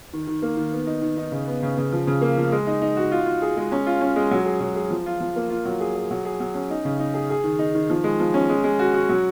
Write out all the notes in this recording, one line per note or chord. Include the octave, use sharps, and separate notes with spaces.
D#3
D#3
A#3
D#3
B3
D#4
D#3
D#4
C#3
B3
C#3
C#3
F3
C#3
A#3
F3
G#3
D#4
D#4
F#4
F4
F4
G#4
G#3
C#4
F4
C#4
G#3
F#3
G#4
F#3
G#4
F3
F4
F3
A#3
F4
F#3
G#4
G#4
F#3
G#4
F#3
C#4
D#4
C#3
D#4
G#4
G#4
D#3
D#4
D#3
F3
G#3
F3
C#4
G#3
G#3
F#4
F#4
F#3